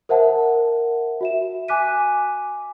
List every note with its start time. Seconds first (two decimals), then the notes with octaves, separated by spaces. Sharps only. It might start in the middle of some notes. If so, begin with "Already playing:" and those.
0.09 A#4 C5 E5 F#5 A5
1.21 F#4 E5 E7
1.68 G#5 D6 F#6 B6 D#7